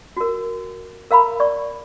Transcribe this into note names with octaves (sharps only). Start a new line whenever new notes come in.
F#4 A#4
A#4 F5 A#5 B5
D5 C#6